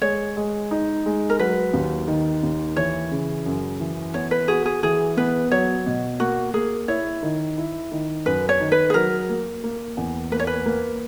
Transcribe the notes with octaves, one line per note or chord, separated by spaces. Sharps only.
G#3 C#5
G#3
D#4
G#3
A#4
F#3 B4
D#2
D#3
D#2
E3 C#5
C#3
F#2
E3
B3 C#5
B4
F#4 G#4
G#4
E3 G#4
B3 B4
F#3 C#5
B2
A#3 F#4
A#3 G#4
E4 C#5
D#3
E4
D#3
F#2 B4
C#5
D#3
B4
G#4
F#3 A#4
A#3
A#3
E2
A#3 B4
C#5
B4
A#3